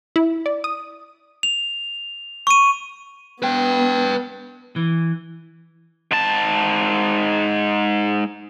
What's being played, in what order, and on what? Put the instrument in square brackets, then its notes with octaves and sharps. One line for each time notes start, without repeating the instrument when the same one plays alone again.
[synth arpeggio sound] E4
D5
D#6
[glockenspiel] F7
C#6 D#7
[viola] B3 [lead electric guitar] B4 G5
[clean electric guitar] E3
[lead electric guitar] G#2 A5